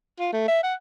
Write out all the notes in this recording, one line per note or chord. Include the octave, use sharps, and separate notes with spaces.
F4
A3
E5
F#5